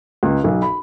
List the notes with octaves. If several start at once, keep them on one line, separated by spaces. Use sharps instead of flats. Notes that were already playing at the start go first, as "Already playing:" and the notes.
C#2
B1
B5